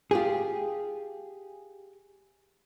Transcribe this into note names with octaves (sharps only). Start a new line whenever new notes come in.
F4 G4 G#4